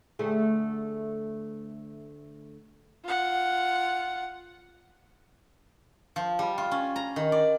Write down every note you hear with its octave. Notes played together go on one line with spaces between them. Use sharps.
D2 A3 G#4
F4 F#5
F3
G3
F4
C#4
A#5
D#3
D5